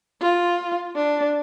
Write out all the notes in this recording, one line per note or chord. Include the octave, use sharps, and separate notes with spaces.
F4
D4